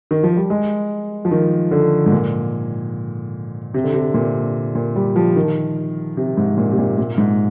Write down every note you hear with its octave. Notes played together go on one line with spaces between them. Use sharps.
D#3
F3
G3
G#3
F3
D#3
D3
G#2
A#2
C3
D3
C3
A#2
A#2
G3
F3
D#3
C3
G#2
A#2
C3
A#2
A#2
G#2